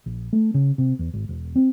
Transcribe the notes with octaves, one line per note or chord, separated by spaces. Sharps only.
A#1
A3
C#3
C3
E2
G#1
E1
C4